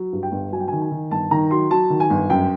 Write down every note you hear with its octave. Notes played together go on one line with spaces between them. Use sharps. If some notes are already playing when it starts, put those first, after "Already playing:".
Already playing: F#3
G2
G5
G1
F#3 G#5
G5
D#3 G#5
G#5
D#3
G1 A5
D#3 A#5
F#3 C6
F#3 A5
D#3
G#5
G1
F#2 G5